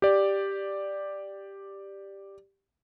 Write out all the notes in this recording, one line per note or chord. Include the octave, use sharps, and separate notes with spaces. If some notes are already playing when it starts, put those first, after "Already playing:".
G4 D5